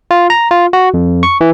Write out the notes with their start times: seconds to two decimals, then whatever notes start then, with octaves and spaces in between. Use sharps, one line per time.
0.11 F4
0.30 A#5
0.51 F4
0.73 F#4
0.94 F2
1.23 C#6
1.41 E3